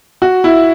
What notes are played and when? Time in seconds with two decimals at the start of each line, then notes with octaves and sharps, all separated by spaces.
0.22 F#4
0.44 E4